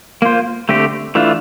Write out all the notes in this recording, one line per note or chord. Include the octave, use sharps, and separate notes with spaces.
A#3 F4 C5
D3 A3 C4 G4
E3 A3 D4 F4